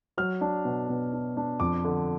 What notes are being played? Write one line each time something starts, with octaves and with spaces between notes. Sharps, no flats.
F#3 F6
D4
B2
B2
D4
D4
F2 D6
D3